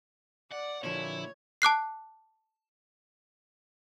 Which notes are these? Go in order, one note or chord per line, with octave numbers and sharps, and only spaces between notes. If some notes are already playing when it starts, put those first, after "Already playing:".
D5 F#5
A#2 D3 F3 E4 C#5
A5 D6 F#6 C7